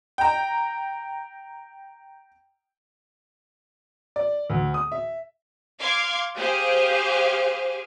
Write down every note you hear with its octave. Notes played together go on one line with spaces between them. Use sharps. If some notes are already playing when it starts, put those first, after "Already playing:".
G5 A#5
D5
D2
D#6
E5
F5 C6 D6 G#6
G4 G#4 C5 F5